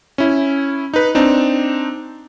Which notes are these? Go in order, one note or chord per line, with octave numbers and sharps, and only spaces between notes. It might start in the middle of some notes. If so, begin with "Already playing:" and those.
C#4 E4
D#4 B4
C4 D4 D#4